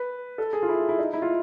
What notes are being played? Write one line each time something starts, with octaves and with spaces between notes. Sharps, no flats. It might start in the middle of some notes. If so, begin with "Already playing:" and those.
Already playing: B4
A4
G#4
F4
E4
E4
D#4
E4
F4